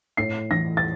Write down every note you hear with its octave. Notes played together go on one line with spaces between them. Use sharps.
A2 C7
E3 A#6
A6